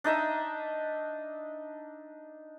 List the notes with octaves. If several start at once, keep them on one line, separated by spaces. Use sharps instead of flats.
D4 D#4 D#5 E5